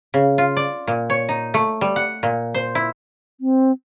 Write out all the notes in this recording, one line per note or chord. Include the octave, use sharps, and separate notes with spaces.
C#3
F4
D5
A#2
C#5
D#4
A3
G3
F#5
A#2
C5
E4
C4